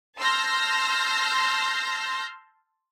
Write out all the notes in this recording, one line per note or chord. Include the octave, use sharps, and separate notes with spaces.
A5 C6 E6 F6 G6 A#6